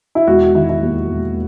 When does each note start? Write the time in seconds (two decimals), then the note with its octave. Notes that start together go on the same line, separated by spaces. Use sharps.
0.15 E4
0.27 E1 F#4
0.55 D#3 E4
0.69 E4
0.83 D#2
1.11 E1